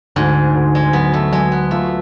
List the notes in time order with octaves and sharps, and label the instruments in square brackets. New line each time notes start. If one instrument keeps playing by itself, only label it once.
[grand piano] D2 [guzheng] G#2
[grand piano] D2
[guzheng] G#3
[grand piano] F#3 [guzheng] B3
[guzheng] A3
[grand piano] F#3 [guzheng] G#3
[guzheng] B3
[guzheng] A3 [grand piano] F4